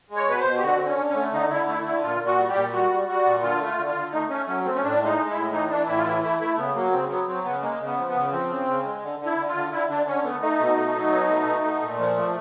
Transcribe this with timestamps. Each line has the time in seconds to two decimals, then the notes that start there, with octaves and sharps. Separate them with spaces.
0.10 G#3
0.16 C#5
0.28 B2 B4
0.39 C5
0.45 B2
0.58 G4
0.62 D3 F#4
0.78 D3 C4
0.87 C#4
0.97 D3
1.09 C#4
1.15 A3
1.33 D3 D#4
1.50 D3 E4
1.67 A3 E4
1.85 D3 E4
2.03 A#2 F4
2.21 A#2
2.26 F#4
2.38 G3
2.49 G4
2.55 A#2
2.73 G3 F#4
2.90 G3
3.08 G3 F#4
3.25 A#2
3.42 D3 F4
3.60 A3
3.66 F4
3.78 D3
3.89 F4
3.95 D3
4.12 A3 D#4
4.30 A3 C#4
4.47 F#3 C#4
4.65 A3 C4
4.75 C#4
4.83 A2 D4
5.00 G#3
5.06 D#4
5.17 G#3
5.30 E4
5.35 A2
5.52 E3 D#4
5.70 E3 D4
5.87 A2 E4
5.98 F4
6.05 E3 E4
6.22 A3 E4
6.40 A3 E4
6.57 C#3 B3
6.75 F#3 A#3
6.92 C#3 C4
7.10 F#3 B3
7.27 F#3 C4
7.44 C#3 B3
7.62 G#3 A#3
7.80 C#3
7.86 B3
7.98 F3
8.09 B3
8.15 C#3
8.32 F3 C4
8.49 C#3
8.67 C#3
8.84 G#3
9.03 D3
9.19 D3
9.26 E4
9.38 D3
9.48 F4
9.55 D3
9.72 D3 E4
9.90 D3 D4
10.07 D3 C#4
10.24 A3 B3
10.42 A3 D#4
10.60 B2
10.77 A3
10.95 F#3
11.12 B2
11.29 A3
11.46 B2
11.65 A3
11.82 A#2
11.99 F3
12.17 A3